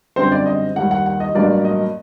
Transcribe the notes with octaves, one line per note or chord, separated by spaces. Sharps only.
F#2 D3 G3 C4 C5
D5
D#5
D#2 D#3 G3 F#5
F#5
F#5
D#5
A1 G2 F#3 A#3 D5
D#5